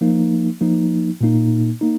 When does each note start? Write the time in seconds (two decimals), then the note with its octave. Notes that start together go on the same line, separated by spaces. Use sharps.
0.01 F3 A#3 D#4
0.61 F3 A#3 D#4
1.21 A#2 A#3 D#4
1.81 A#3 D#4